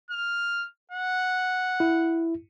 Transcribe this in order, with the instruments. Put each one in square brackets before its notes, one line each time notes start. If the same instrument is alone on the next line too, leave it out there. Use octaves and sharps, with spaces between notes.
[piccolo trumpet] F6
F#5
[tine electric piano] E4